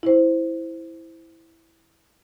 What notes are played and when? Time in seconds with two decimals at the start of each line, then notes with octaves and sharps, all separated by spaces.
0.03 E4 C5